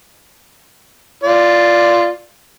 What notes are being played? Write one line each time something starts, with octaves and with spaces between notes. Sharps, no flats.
F4 D5